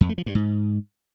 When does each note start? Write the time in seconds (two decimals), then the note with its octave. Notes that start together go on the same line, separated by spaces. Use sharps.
0.01 F2
0.09 A3
0.18 F3
0.26 G2
0.35 G#2